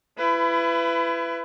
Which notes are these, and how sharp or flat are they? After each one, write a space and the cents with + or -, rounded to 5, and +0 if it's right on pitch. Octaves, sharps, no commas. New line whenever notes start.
E4 +35 B4 +20